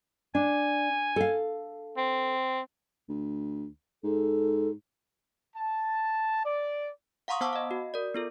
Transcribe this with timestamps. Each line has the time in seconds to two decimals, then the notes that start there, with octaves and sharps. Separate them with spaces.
0.35 D4 G#5
1.16 A4 F5
1.97 C4
3.09 D2
4.04 G#2 A4
5.56 A5
6.45 D5
7.28 F5 F#5 A#5 C6 C#6 D#6
7.41 B3 C5 F#5 A5 D6 E6
7.53 D#5 F5
7.71 F#4
7.94 A#4 D5
8.14 B3 F4 A4